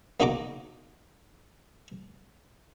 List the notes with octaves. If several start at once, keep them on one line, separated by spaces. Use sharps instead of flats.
A#3 D#4 F#4 A#5 D6